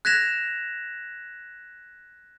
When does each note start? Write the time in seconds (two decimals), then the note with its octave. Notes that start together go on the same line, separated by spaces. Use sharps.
0.05 F#6 G#6 A#6 B6 E7 F7